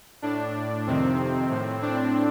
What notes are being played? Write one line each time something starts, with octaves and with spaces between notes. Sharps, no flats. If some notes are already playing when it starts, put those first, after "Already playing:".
A2 D4
F2 C3 D#3 C4
A2
D4